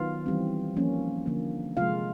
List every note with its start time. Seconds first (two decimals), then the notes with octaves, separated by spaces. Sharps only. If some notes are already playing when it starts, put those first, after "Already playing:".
Already playing: D#3 F#3 B3 F4 F5
0.26 E3 G3 C4
0.76 F3 A#3 C#4
1.26 D3 F3 A#3
1.77 C3 F3 G#3 F4 F5